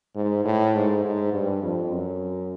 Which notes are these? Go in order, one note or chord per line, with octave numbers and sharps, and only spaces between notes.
G#2
A2
G#2
G#2
G2
F2
F#2